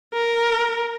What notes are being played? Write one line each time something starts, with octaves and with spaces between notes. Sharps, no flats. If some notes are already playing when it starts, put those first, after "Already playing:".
A#4